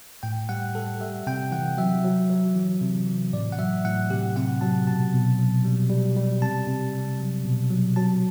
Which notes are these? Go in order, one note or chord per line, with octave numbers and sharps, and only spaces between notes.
A2 G5
G3 F#5
G3 A4
G3 E5
C3 G5
E3 F#5
F#3 E5
F#3
F#3
E3
C3
E3
A2 D5
F#5
F#3 E5
A2 F#5
C3 G4
C3 F#5
F#3 A5
B2 A5
B2
F#3
G3
G3
G3
C3 A5
C3
G3
F#3
B2
F#3
F#3 A5